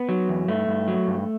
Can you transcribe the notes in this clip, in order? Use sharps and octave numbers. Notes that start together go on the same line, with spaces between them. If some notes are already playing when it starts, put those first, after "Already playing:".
Already playing: B3
F#3
E2
G2 A3
G2
F#3
G2